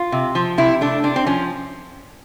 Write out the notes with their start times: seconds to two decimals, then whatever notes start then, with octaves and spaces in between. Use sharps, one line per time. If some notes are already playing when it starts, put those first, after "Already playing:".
Already playing: F4
0.12 C3
0.35 F3
0.58 C3 E4
0.81 A3 D4
1.04 C3 D4
1.16 C4
1.26 F3 C#4